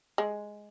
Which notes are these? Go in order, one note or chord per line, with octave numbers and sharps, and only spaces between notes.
G#3